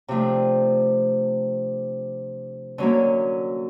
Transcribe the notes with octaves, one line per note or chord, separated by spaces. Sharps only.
C3 F3 A3 D4
D3 F#3 A#3 C#4